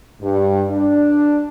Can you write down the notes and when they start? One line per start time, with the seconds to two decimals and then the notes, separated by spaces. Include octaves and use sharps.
0.21 G2
0.70 D4